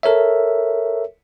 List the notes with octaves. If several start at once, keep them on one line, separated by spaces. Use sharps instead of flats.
A4 A#4 C#5 E5